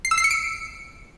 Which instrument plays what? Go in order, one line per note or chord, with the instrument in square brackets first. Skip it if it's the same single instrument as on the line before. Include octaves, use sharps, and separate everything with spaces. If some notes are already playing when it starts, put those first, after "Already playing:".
[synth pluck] C7
E6
C7
C#7
D7